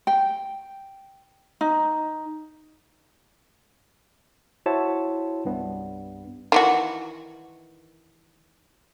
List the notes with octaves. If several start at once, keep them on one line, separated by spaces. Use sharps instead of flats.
G5
D#4
E4 F#4 C5 C#5 E5 A5
C2 G2 B3
D#3 E3 F#4